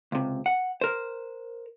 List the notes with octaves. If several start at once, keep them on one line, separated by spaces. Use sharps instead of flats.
C#2 C3
F#5
A#4 C5